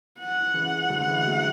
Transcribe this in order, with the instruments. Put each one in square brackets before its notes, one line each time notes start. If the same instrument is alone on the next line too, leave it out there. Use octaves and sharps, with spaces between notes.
[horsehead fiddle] F#5
[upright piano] C#3 E3
D3 F#3
A3
E3 G#3
F#3 A3